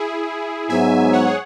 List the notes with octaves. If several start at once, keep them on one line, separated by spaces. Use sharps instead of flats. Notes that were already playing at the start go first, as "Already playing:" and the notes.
Already playing: E4 G#4
G#2 F#3 B3 E5 G#5
C#5 F#5
G#4